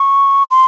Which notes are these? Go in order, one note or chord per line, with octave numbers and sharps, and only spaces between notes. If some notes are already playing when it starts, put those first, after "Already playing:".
Already playing: C#6
C6